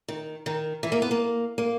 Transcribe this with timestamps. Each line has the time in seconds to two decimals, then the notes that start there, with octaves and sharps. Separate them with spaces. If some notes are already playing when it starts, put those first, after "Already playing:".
0.08 D#3
0.46 D#3
0.83 E3
0.92 A#3
1.02 B3
1.11 A#3
1.58 A#3